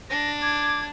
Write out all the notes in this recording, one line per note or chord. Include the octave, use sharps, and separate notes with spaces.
D4 A#6
D6 G#6